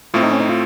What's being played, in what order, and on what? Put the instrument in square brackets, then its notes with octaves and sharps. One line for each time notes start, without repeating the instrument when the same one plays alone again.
[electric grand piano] A2 A3 C4 [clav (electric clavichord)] F4
[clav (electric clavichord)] D#4
C#4
D#4
F4